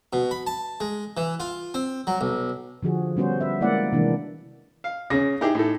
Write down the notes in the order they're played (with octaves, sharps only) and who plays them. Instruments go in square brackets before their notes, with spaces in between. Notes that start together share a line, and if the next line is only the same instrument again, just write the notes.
[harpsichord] B2
B5
A5
G#3
E3
F4
C4
F#3
B1
[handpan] D3 F3 F#4 G#4
G3 B3 C#4 F#4 C5
B4 E5
G#3 A#3 E4 D5 F#5
C3 D#3 E3 G#3 A#3 D4
[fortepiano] F5
[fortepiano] C#3 [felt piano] C#4 A#6
[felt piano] D#4 [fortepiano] E4 G4 G#4
[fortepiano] A2 A4